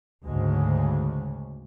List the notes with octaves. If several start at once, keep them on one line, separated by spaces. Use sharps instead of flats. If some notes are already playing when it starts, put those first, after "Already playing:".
D2 G#2 C#3 G#3